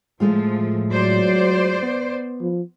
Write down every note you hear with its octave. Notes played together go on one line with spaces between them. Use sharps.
A2 F3 G#3 A3 F4
F#3 C5 D5
B3
F3